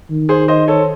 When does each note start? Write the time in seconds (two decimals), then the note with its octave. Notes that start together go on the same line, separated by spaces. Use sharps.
0.10 D#3
0.29 G#4 C5
0.48 C5 D#5
0.68 A4 C#5